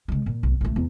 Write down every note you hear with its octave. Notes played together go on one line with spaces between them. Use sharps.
C#3 G#3
A#2
B1
A#1 A3
E2